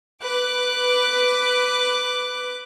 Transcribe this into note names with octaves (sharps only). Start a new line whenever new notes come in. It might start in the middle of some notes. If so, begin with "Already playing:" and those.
B4 D6 F#6